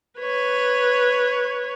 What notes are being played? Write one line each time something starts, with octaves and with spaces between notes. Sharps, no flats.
B4 C#5